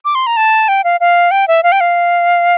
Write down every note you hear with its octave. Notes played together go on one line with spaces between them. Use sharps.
D6
C6
A#5
A5
G5
F5
F5
G5
E5
F5
G5
F5